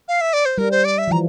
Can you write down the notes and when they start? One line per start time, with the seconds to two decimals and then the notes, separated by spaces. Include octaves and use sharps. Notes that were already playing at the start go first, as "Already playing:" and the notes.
0.08 F5
0.21 E5
0.33 D5
0.45 C5
0.58 G3 A#4
0.71 C5
0.85 D5
0.98 E5
1.08 F3
1.11 E3 A#5